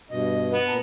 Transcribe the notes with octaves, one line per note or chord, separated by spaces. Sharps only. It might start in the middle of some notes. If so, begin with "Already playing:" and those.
G2 B2 D#5
B3
A#2 A5 A#5